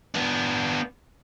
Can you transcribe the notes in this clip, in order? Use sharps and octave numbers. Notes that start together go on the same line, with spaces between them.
B3 D4